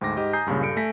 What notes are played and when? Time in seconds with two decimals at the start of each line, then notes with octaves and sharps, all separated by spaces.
0.01 D2 G#2 G5 D6 A#6
0.17 G#2 G4 D#5
0.33 G#5 A#5 D#6 G6 C7
0.46 C#2 G2 A#2 C#3
0.61 G2 A4 C#7 D7
0.77 A3 G#5 A#6 B6